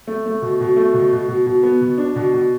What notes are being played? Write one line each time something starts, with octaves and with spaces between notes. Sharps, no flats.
A3
A3
B2
B2
A3
B2
B2
B2
B2
B3
B2
D4
B2
B2